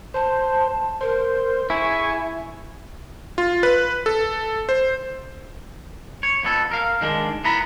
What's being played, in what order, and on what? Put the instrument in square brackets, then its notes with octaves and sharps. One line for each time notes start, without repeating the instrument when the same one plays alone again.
[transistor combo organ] C5 [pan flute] A5
[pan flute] A#4 [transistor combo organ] C5
[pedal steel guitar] E4 [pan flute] G#4 [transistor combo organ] G#5 C#6
[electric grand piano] F4
B4
A4
C5
[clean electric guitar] C#5
F2 B3 A4
A#4 F5
D#3 G#3 D4
B3 E4 A#5 B5